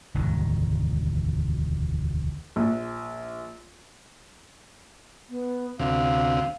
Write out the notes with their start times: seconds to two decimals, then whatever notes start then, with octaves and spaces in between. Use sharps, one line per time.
0.14 E1 D2 G#2 D#3
2.56 A#1
5.29 B3
5.79 D2 C3 F5